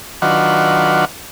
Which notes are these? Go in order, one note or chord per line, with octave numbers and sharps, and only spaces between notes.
D#3 F#3 D4 F4 F#4 B4